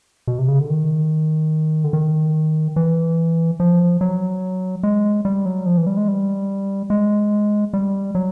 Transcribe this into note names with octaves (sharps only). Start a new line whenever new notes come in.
B2
C3
C#3
D3
D#3
D3
D#3
E3
F3
F#3
G#3
G3
F#3
F3
E3
G3
G#3
G3
G#3
G3
F#3